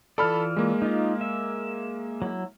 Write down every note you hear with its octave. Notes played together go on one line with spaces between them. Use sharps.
E3 F4 A4 D5 B5 F6
G#3 A#3
D#4 F4
E5
F#3 E4